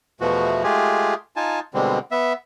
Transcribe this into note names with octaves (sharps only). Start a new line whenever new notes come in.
E2 B2 E3 F3 A3 F#4
G#3 A3 F4 G4 G#4
D#4 F4 G#5 A5
B2 D3 G3 G#3 C4
B3 E5